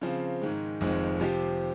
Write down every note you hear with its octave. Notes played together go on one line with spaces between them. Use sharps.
C#3 F3 C4
G#2 D#3 G#3
F1 F2 D#3 G#3 C4
C3 F3 C4 G4